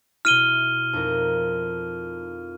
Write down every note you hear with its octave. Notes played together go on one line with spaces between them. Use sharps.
B2 E4 F6 D#7 G7
F2 D#4 A#4